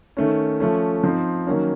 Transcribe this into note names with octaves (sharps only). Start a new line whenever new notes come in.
D#3 A3 C#4
F3 A3 C#4
F3 C4 D#4
D#3 F#3 A#3 C#4